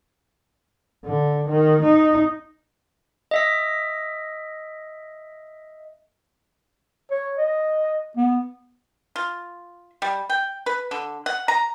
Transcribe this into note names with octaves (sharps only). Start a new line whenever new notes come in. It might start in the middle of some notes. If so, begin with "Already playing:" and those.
D3
D#3
D#4
D#5 E5 B6
C#5
D#5
B3
F4
G3
G5
B4
D3
F#5
A#5